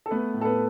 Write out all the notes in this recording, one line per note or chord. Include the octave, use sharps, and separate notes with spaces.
A4
A3 B3 B4
A2
A4
B3 B4